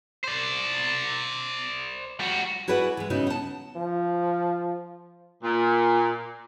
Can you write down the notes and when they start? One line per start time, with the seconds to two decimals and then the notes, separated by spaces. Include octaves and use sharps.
0.24 C5 D5
2.20 G3 F#4
2.68 E4 F#4 G#4 B4 D5 F#5
2.97 E3 G#3
3.10 C#3 B3 D#4 E4 F#4
3.27 F#5 A5
3.76 F3
5.44 A#2